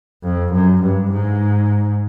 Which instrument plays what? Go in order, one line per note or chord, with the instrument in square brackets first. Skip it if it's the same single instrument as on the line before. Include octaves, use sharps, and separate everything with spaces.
[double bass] F2
F#2
G2
G#2